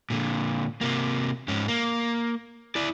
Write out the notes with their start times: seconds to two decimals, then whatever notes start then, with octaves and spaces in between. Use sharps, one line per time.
0.10 A#2 D3
0.81 C3 A#3
1.48 G#2 C#4
1.68 A#3
2.76 E4 D5